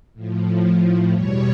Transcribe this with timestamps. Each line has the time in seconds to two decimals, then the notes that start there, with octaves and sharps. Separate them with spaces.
0.14 A2 F3
1.11 E2 B2 G3 C#5